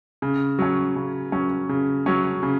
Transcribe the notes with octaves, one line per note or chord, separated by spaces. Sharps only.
C#3
F#3 C#4
C#3
F#3 C#4
C#3
F#3 C#4
C#3